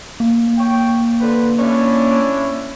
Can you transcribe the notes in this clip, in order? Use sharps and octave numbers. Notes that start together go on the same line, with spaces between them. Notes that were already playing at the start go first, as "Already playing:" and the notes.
A#3
C#5 G5
D3 B4 C5
C#4 D4 E4